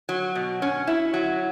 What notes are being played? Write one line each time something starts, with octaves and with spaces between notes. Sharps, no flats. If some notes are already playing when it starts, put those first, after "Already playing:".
F#3
B2
C#4
E4
F#3